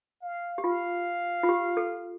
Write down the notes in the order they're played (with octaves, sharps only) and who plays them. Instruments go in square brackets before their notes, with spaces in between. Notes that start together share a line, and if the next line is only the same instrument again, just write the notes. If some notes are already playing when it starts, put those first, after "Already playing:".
[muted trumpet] F5
[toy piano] G4
[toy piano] F4 [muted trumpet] F5
[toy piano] F4
G4
A4